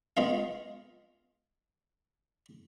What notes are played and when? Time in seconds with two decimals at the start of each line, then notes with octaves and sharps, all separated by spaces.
0.17 G#3 B3 F4 G#4 F5